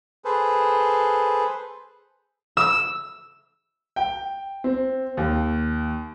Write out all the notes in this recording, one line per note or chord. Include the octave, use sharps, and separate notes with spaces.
G#4 A4 B4 C5
E6
G5
C4
D#2